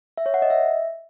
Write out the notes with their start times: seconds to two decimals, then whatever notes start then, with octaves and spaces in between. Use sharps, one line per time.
0.18 E5
0.26 C#5
0.34 F#5
0.42 D#5
0.50 E5